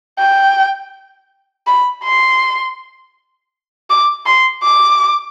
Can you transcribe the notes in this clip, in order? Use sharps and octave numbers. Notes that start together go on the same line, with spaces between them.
G5
B5
C6
D6
C6
D6